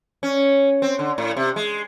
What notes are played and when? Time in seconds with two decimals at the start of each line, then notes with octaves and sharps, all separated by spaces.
0.23 C#4
0.82 C4
0.99 D3
1.18 A2
1.37 C3
1.56 G#3